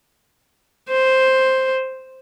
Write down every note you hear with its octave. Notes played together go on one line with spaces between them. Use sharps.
C5